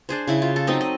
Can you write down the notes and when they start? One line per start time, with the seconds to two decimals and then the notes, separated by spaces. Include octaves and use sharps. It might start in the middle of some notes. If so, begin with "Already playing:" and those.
0.09 D4 G#4 C5
0.28 C#3 E4 B5
0.42 F4
0.56 A4
0.67 F#3 C4 D#4 D#5
0.81 D#5